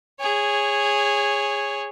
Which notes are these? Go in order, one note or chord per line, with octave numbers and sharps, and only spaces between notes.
G#4 C#5